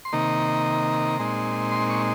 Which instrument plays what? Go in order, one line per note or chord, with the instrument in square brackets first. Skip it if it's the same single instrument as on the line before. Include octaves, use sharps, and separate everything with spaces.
[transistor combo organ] C6
C3 D#3 A#3 D#4 A#5
A#2 G#3 C4 D#4
C6
C#6